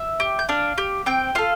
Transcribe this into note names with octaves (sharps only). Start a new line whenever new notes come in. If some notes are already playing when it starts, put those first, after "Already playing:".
Already playing: E5 E6
G4
G6
D4 F5 F6
G4
C4 G5 G6
F4 A4 F5 F6